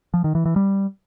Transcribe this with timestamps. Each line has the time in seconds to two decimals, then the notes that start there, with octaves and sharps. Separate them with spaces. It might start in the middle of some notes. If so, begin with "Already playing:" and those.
0.14 F3
0.24 D#3
0.35 E3
0.45 E3
0.56 G3